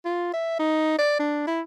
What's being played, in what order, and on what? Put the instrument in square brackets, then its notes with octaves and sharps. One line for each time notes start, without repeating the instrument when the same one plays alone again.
[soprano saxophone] F4
E5
D#4
D5
D4
E4